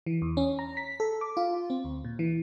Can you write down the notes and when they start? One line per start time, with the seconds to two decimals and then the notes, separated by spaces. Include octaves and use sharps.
0.06 E3
0.22 E2
0.37 C#4
0.59 A#5
0.77 B6
1.00 A4
1.21 D6
1.37 F4
1.70 C4
1.85 D2
2.05 A#2
2.19 E3